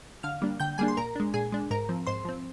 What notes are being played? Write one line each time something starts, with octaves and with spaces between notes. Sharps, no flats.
D3 F5 F6
G3 A#3 D4
D3 G5 G6
G3 A#3 D4 G#4 G#5
C6
A#2 A#4 A#5
G#3 D4
A#2 G#4 G#5
G#3 D4
G#2 A#4 A#5
F3 C4
G#2 C5 C6
F3 C4